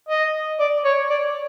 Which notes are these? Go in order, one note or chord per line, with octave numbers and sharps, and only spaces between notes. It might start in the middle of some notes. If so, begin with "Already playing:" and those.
D#5
D5
C#5
D5